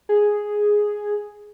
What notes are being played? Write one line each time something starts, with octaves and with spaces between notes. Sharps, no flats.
G#4